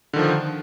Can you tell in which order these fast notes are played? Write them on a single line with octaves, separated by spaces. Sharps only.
D3 D#3 F3